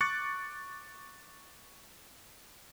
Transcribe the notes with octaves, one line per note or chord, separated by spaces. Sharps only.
C#6 D6 F#6 A6 C#7